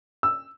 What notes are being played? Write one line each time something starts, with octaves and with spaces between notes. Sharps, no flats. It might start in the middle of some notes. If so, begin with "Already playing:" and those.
E6